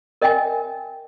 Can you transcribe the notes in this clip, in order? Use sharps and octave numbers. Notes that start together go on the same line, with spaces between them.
A#4 D#5 E5 G5 G#5